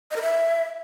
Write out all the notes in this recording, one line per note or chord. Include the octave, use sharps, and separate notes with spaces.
D#5
A#4
E5